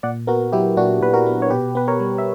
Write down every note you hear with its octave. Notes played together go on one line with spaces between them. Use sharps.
A#2 D5 F#5
B3 F#4 A#4
F#3 E4 G4
A#2 D4 F#4
A#2 B4
F#4 A#4
B3
C#5
B2 G4 B4
B3 B4
A#4 C#5
G3
E5